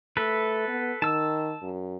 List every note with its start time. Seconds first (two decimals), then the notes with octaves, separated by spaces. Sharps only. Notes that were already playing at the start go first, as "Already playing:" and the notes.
0.17 A3 A4 B4
0.68 B3
1.02 D#3 A5 E6
1.62 F#2